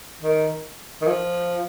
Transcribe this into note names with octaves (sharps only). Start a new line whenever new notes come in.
D#3
D#3
F3